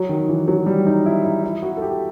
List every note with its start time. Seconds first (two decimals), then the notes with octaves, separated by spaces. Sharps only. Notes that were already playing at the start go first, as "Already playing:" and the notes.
Already playing: F#3
0.09 D#3
0.29 E3
0.48 F#3
0.66 G3
0.87 D#4
1.06 E4
1.25 E4
1.44 E4
1.63 F#4
1.77 A4
1.82 G4